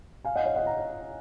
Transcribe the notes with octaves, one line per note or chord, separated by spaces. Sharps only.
F5 G#5
D#5 F#5
C#5 F5
D#5 F#5
F#5 A#5